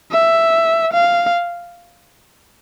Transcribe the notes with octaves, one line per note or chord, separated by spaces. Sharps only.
E5
F5